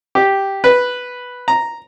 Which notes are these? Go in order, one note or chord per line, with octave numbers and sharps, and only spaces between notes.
G4
B4
A#5